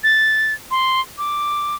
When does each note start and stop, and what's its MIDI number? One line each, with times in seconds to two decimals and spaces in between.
0.04 0.54 93
0.71 1.01 84
1.18 1.76 86